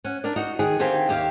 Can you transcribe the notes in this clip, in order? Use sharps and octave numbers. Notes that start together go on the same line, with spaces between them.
C#4 F#5
D4 A#4 D5
D#4 F#4
D#3 G#4 F#5 G#5
D3 D#3 C4 G4 F5 G#5
D#2 G4 E5 F5